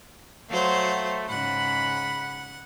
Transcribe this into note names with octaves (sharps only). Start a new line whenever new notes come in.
F#3 A3 C5 F5
G#2 C#3 F#5 B5